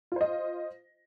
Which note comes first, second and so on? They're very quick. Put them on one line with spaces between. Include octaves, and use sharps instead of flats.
F4 C5 D#5